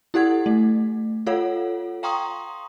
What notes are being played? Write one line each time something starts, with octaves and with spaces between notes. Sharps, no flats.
E4 G4 A4 F#5 G#6
A3
F4 A4 C#5 F5 F#5
F5 G5 A#5 C6 C#6 D#6